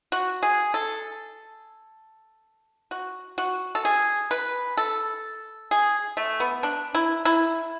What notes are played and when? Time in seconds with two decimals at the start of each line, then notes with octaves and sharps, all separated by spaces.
0.12 F#4
0.43 G#4
0.74 A4
2.91 F#4
3.38 F#4
3.75 A4
3.85 G#4
4.31 B4
4.77 A4
5.71 G#4
6.17 A3
6.40 B3
6.63 D4
6.95 E4
7.25 E4